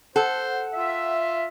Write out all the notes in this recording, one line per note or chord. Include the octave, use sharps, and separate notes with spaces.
A4 C5 F#5
F4 E5